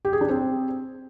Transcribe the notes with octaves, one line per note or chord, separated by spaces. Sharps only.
G4
G#4
D4
C4